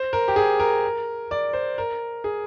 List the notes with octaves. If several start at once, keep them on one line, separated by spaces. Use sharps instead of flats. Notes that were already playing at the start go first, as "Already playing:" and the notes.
Already playing: C5
A#4
G4
G#4
A#4
D5
C5
A#4
G#4